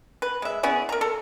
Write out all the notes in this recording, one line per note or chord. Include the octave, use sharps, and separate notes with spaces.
B4
G#3 E5
B3 C#4 E4 G#4
A#4 A#5
A4